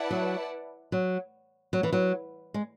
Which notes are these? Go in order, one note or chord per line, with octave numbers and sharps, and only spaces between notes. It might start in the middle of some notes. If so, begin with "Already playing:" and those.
Already playing: E4 B4 D5 F#5 A5
F#3
F#3
F#3
E3
F#3
G#3